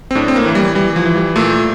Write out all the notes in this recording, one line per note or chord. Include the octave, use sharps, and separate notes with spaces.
C4
A2 D4
C4
A#3
E3
G3
E3 G3
F3
E3
G3
A#2 A3